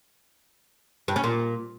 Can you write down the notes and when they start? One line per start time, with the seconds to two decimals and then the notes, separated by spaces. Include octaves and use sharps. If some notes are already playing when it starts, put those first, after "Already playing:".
1.08 G2
1.16 C#4
1.24 A#2